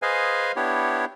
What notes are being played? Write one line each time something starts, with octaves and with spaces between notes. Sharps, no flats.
G#4 B4 C5 D#5 F5 G#5
B3 D4 E4 G4 C#5